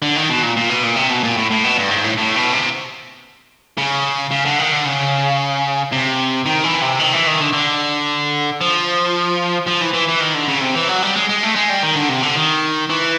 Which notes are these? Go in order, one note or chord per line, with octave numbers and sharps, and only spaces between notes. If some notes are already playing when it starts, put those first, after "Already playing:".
D3
D#3
B2
A#2
A#2
B2
A#2
C3
B2
A#2
A2
A2
B2
G2
G#2
A2
A2
B2
C3
C#3
C#3
D3
D#3
D3
C#3
C3
D#3
E3
C3
D#3
E3
D#3
D3
D3
F3
F3
E3
E3
E3
D#3
D3
C#3
C3
E3
F#3
G3
G#3
G#3
A3
G#3
G3
D#3
D3
C3
D3
D#3
E3